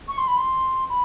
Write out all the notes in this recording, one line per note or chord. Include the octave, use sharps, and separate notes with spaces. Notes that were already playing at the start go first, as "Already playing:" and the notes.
C#6
C6
B5
C6
B5